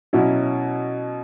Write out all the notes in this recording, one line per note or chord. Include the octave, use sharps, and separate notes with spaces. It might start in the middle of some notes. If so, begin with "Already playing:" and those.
B2 F#3 C#4 E4